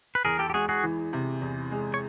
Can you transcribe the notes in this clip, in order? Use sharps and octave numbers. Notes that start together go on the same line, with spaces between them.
B4
E2 G#4 A#4
G4 A4
G4
G#3 F#4 G#4
F#4 G#4
E3
C3
E2
G#3
C#5